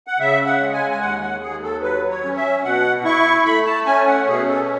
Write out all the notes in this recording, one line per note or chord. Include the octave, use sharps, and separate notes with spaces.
F#5
C#3 E5
F#5
G#3
G#5
G#5
D#2 F#5
F#5
D#2 G#4
A4
F#3 B4
C#5
C#4
E5
B2 F#5
E4 C#6
A3 B5
A5
C#4 G#5
F#5
B2 G#4
A4